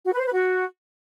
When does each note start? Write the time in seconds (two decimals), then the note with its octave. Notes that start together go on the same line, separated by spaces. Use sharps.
0.05 F#4
0.12 B4
0.19 C5
0.26 B4
0.32 F#4